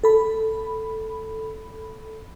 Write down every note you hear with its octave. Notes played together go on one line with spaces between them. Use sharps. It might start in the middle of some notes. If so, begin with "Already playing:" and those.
A4 B5